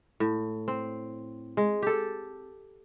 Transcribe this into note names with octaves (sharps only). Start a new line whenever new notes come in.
A2
C4
G#3
G4 A4